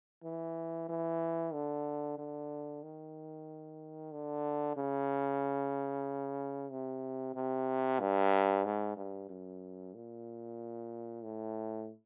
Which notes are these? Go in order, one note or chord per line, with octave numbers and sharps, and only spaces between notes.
E3
E3
D3
D3
D#3
D3
C#3
C3
C3
G2
G#2
G2
F#2
A#2
A2